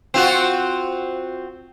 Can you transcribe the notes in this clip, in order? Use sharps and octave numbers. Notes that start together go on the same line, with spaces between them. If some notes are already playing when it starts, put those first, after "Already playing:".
C4 F4 F#4